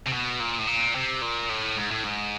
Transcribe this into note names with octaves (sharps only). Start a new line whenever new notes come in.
C3
B2
A#2
A2
A#2
C3
A#2
A2
G#2
A2
G#2